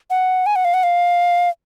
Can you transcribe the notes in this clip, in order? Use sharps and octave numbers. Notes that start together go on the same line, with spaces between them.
F#5
G#5
F#5
F5
F#5
F5